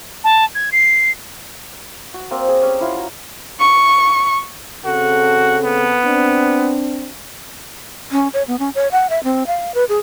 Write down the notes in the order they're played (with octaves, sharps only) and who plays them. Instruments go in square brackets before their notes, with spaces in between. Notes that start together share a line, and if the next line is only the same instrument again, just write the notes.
[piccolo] A5
G#6
C7
[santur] F#4
A#3 C4 D5
G#4
C#4 G4
E4 F4 F5 F#5
F#4 A#5
[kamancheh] C#6
[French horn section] C#3 C4 A4 [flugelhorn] F#4
[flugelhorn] B3
[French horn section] C4 D4
[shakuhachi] C#4
C#5
B3
C#4
C#5
F#5
E5
C4
F5
B4
G#4